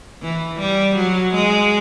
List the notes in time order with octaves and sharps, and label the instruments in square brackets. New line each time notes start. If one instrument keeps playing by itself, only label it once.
[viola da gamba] E3
G3
F#3
G#3